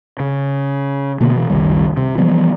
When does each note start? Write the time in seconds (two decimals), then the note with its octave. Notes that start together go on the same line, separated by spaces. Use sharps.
0.20 C#3
1.21 B2 D3 A#3 B3
1.36 B2 E3
1.50 F#1 C2 D#3 G3
1.97 C3
2.18 E3 F3 G3 B3